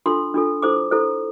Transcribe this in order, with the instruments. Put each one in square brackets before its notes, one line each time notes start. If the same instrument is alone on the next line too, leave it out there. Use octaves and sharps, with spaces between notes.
[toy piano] D4 F4 A4 C6
D4 F4 A4
E4 A4 C5 D6
E4 A4 C5